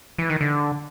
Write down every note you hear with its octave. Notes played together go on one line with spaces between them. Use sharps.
E3
D#3
D3